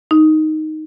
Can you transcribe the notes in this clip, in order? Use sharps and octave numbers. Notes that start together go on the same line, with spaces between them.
D#4